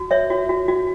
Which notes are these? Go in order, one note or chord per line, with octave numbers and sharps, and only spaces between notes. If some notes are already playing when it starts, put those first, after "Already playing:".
Already playing: F#4
C#5 E5
F#4
F#4
F#4